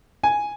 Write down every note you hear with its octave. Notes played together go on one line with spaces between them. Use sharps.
G#5